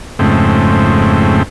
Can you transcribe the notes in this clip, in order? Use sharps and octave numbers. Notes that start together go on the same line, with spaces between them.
F2 G#2 C#3 A3 C4